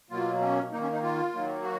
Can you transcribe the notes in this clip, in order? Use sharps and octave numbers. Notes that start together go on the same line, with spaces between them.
B2 F#3 A#3 F4
C#4
D#3 A#3 D#4
C#4
D#4
F4
D#3 F#3 A#3
F#4